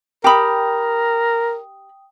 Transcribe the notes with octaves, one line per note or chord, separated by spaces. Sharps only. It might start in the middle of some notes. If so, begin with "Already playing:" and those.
G4 A#4 G5 B5 D#6